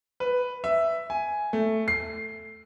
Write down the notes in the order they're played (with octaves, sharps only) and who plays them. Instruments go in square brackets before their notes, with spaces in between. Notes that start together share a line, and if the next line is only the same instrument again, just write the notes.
[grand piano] B4
E5
G#5
A3
C7